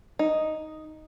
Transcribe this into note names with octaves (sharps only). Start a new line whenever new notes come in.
D#4